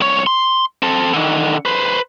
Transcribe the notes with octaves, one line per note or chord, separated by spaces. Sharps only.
C2 C#5
C6
C4 A4
D3 D#3
B4 C5